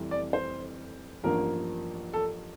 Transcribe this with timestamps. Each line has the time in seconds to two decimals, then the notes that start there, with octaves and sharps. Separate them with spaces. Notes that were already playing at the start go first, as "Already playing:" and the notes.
Already playing: F1 F2 E3 G3
0.11 D5
0.33 C5
1.24 A1 G2 F3 A#3 A#4
2.14 A4